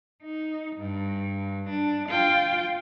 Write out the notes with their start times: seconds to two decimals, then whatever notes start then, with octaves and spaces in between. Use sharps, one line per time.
0.23 D#4
0.77 G2
1.70 D4
2.09 F4 G5